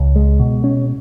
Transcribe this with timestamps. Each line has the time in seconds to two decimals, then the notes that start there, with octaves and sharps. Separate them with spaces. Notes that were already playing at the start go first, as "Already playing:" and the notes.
Already playing: C#2
0.16 G#3
0.40 B2
0.64 C#4